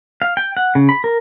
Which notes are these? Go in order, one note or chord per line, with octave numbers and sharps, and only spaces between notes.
F5
G5
F#5
C#3
B5
A#4